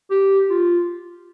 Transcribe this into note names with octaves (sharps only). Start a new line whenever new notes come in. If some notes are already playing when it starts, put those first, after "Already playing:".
G4
F4